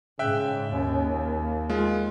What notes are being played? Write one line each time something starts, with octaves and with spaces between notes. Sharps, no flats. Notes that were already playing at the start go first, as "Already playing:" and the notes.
G#2 C#3 E5 G5 F#6
D#2 C#4
A#3
G#3 F4